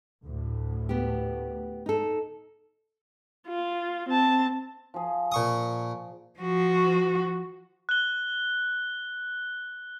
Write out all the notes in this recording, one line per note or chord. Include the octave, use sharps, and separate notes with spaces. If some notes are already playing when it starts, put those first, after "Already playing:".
D2 A2
B3 G4
D#4 A4
F4
C4 A5
F3 G#4
A#2 C#6 D#6
F3 F#4
F#6 G7